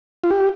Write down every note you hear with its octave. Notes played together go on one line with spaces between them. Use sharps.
F4
G4